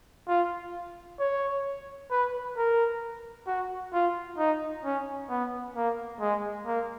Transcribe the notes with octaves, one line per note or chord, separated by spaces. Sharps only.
F4
C#5
B4
A#4
F#4
F4
D#4
C#4
B3
A#3
G#3
A#3